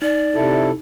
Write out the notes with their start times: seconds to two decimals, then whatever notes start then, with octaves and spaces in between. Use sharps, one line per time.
0.02 D#4 D5
0.35 C3 E4 A4